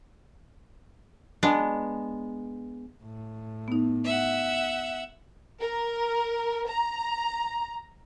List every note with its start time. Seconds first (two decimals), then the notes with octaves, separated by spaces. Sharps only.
1.43 G#3 B3 D4
3.03 A2
3.68 B3 D#4
4.05 E5 F#5
5.61 A#4
6.67 A#5